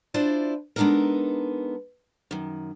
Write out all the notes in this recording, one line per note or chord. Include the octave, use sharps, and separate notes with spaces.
D4 E4 F4 C5 D5
G#3 B3 D4 D#4 A4 A#4
F#2 D#3